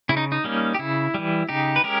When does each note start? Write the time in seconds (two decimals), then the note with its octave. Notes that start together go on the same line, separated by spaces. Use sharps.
0.09 C#3 E4
0.17 D#4
0.32 D#4
0.44 G3 A#3 C#4
0.74 G4
0.79 C#3 E4
1.14 E3 G3
1.49 C#3 D#4 G4
1.76 B4
1.84 G#3 C#4 G4 A#4